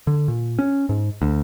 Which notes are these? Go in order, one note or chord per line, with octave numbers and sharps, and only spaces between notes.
D3
A#2
C#4
G#2
D2